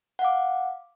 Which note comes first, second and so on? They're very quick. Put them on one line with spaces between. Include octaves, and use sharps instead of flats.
F#5 F5 D6